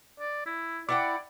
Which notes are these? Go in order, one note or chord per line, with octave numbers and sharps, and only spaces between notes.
D5
E4
E4 D5 F#5 G5 D6